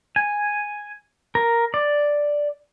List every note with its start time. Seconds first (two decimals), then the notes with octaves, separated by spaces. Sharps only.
0.16 G#5
1.35 A#4
1.74 D5